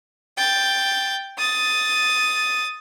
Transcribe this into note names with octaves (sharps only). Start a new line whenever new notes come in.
G5 A6
D#6 A6